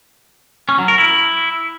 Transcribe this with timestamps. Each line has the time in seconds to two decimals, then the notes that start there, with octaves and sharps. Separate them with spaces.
0.69 C#4
0.78 F#3
0.88 A#4
0.98 E4